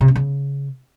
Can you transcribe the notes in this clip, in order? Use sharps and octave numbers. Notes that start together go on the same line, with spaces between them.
C3
C#4
C#3